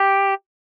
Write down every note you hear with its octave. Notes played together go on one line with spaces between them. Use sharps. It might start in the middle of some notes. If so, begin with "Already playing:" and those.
Already playing: G4